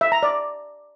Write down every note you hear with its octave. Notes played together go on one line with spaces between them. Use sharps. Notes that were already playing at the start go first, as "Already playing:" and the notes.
E5
A#5
D5